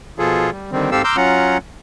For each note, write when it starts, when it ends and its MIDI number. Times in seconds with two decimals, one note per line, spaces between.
0.19 0.50 47
0.19 0.50 53
0.19 0.50 65
0.19 0.50 68
0.19 0.50 69
0.51 0.72 55
0.72 0.91 50
0.72 0.91 51
0.72 0.91 55
0.72 0.91 60
0.92 1.02 44
0.92 1.02 60
0.92 1.02 67
0.92 1.02 69
0.92 1.02 77
0.92 1.02 88
1.04 1.16 82
1.04 1.16 84
1.04 1.16 86
1.04 1.16 88
1.04 1.16 89
1.04 1.16 91
1.16 1.58 54
1.16 1.58 61
1.16 1.58 65
1.16 1.58 78
1.16 1.58 82